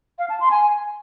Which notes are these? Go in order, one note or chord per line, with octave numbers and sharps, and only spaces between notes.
F5
A5
C6
G#5